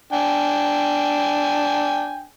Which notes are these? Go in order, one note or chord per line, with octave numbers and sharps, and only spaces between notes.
D4 G5 G#5